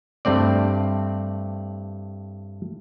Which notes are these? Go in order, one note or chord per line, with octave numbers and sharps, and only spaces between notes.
G2 A3 C4 D5